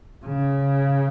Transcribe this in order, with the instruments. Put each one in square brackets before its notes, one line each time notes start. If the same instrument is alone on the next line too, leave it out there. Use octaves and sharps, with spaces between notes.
[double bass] C#3